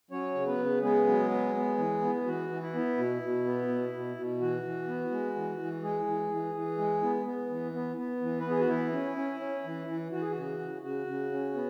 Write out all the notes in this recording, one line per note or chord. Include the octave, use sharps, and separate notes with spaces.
F#3 C#4 C#5
C#3
B3 B4
C#3
G#3 B3 G#4
F#3
B3
B3
E3
B3
E3 F#4
E3
E4
B3
B2
B2
B3
B2
B2
B2
E3 F#4
E3
B3
G#3
E3
E3
G#3 G#4
E3
E3
E3
G#3
B3
B3
E3
B3
B3
E3
B4
B3
G#4
F#4
E3 E4
C#4
C#4
C#4
E3
E3
E3 F#4
G#4
C#3 F#4
C#3
C#3 F#4
C#3
C#4
B3